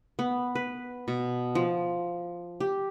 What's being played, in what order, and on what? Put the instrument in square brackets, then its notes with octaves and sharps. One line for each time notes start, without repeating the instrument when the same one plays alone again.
[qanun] B3
B4
B2
F3
G4